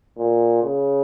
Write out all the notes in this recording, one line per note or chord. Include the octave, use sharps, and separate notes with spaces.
A#2
C#3